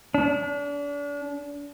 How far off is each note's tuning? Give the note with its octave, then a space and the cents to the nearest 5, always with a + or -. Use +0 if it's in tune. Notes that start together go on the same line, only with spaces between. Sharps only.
D4 -35